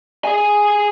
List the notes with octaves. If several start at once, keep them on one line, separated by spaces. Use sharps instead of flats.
G#4 G#5